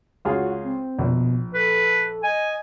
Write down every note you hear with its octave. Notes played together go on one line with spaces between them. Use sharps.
C#2 F4 F#4 G#4
C4
A#1 B2
A4 B4
D#5 G#5